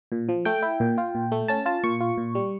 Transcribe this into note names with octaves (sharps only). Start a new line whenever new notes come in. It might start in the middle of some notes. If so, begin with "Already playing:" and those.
A#2
F3
A3 G5
E4
A#2
F4
A#2
A3
C#4 A5
F4 A5
A#2 C#6
F4
A#2
G3